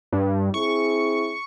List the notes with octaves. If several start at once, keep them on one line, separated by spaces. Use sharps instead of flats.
G2
C4 E4 G#4 C#6